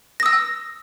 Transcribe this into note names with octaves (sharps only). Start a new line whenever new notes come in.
D#6 E6 A#6